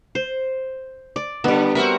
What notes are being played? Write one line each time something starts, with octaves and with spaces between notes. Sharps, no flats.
C5
D5
D3 G3 B3
C4 F#4 A#4 E5 C#6